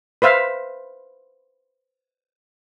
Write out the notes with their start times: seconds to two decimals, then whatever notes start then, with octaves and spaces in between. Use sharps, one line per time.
0.22 B4 C5 E5 F5